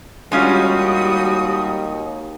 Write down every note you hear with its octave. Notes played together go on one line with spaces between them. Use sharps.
D#2 G3 G#3 C#4 F4 F#4 D#6